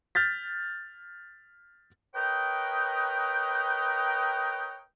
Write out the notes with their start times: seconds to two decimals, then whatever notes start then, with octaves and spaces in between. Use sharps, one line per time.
0.15 F6 G6 A6 B6
2.15 A#4 B4 C#5 D#5 G5